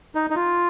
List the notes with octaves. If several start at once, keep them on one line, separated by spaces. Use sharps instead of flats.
D#4
D#4
F4